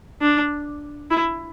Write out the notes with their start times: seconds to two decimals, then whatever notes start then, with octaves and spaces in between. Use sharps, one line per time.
0.21 D4
1.11 E4